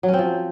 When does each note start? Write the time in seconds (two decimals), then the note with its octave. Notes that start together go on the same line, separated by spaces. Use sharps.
0.03 F#3
0.08 C#4
0.13 C4
0.19 F3